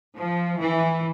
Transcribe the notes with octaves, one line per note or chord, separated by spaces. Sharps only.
F3
E3